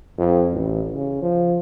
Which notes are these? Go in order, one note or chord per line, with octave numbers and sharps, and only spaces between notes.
F2
A1
C#3
F3